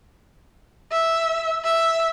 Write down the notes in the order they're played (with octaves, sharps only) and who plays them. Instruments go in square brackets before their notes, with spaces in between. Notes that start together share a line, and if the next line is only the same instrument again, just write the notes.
[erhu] E5
E5